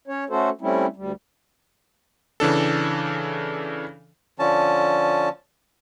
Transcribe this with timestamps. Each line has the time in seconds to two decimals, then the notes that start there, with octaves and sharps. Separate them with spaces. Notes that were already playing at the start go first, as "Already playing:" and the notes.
0.07 C#4 C#5
0.30 A3 C#4 F#4 A4 C5
0.61 G3 A3 C4 C#4 E4
0.96 D2 G3
2.40 C#3 E3 D4 A4
4.39 D3 F3 C#4 A5